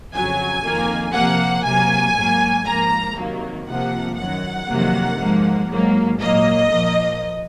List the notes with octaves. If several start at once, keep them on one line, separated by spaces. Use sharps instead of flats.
F2 C#3 F#3 G#5
F2 D#3 A#3
C3 F3 A#3 F#5
C3 F#3 A#3 G#5
G#2 F#3 A#3
G#2 F3 A#3 A#5
C3 D#3 F#3 A#3
C3 F3 A#3 F#5
F#2 D#3 F#3 F#5
F2 C3 D#3 F#3 A#3
G#2 F3 A#3
G#2 F#3 A#3
A#2 F#3 A#3 D#5
A#2 F3 A#3